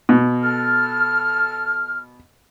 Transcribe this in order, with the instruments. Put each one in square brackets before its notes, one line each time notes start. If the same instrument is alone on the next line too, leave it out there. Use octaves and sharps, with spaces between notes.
[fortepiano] B2
[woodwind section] A4 A5 F6